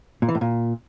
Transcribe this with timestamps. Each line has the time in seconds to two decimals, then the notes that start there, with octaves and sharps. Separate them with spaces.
0.22 A#2
0.28 E3
0.35 A2
0.41 A#2